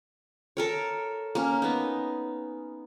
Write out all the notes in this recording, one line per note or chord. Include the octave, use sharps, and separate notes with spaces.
A4 A#4 C#5
A#3 C#4
B3 D#4